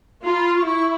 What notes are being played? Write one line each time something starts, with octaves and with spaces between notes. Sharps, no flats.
F4 A#5
B5
C6
C#6
E4 C#6